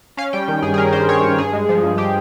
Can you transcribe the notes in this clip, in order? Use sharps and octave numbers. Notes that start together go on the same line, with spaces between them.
C#4 F5
G3 G5
D#3
G2 G#4
G#4
C#4 A#4
G3 C5
D#3 C#5
G2
G2 G#4
G#3
F3
G2
G4